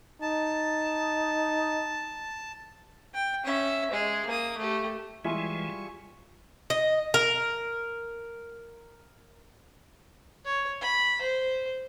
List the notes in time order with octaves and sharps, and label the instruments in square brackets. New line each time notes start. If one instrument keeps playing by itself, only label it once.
[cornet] D#4 [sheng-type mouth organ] A5
[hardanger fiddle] G5
C#4 E5
G#3 G#4
A#3 D#6
A3 G4
[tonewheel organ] E3 G#3 [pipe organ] G3 G#5 C#6 [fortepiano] E4 [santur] F4 G#4
[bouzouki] D#5
A#4
[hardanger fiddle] C#5
B5
C5